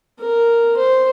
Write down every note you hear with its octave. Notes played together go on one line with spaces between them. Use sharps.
A#4
C5